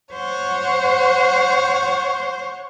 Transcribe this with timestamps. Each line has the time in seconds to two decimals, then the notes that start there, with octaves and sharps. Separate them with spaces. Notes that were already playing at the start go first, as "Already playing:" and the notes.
0.14 C5 C#5 F#5